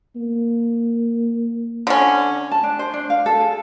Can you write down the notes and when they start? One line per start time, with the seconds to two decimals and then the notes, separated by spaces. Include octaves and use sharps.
0.16 A#3
1.87 D3 C#4
2.51 A5
2.63 D4
2.79 C5
2.94 D4
3.10 F5
3.26 A4
3.41 G#4